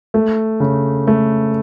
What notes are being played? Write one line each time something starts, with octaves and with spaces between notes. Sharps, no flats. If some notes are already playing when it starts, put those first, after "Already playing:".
A3
C#3
A3